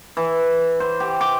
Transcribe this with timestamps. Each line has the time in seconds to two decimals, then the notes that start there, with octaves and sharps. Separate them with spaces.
0.17 E3
0.80 C5
1.00 G4
1.21 D6